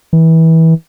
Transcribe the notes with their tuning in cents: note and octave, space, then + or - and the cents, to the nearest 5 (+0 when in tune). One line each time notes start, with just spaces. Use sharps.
E3 -25